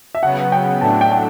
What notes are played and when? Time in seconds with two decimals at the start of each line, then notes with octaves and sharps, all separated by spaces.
0.15 E5
0.23 C#3 F#3 B3 F#5
0.52 G5
0.81 A2 F#3 A3 D4 A5
1.01 G5
1.12 G5